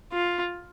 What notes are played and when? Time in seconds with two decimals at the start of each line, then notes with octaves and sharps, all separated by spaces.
0.13 F4